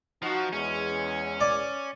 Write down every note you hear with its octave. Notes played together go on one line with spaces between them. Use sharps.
F3 D#4 F#4
E2 G#3 C#4
D5